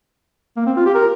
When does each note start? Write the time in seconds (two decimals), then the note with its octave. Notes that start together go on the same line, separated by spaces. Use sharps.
0.57 A#3
0.66 C4
0.77 F4
0.86 G4
0.94 A#4